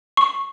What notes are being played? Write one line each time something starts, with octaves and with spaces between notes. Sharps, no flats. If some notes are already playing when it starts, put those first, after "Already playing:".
C#6